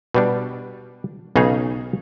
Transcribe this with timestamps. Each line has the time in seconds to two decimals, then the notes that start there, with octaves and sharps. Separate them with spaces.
0.15 B2 G3 D4
1.36 B1 C#3 D#4 G#4 F5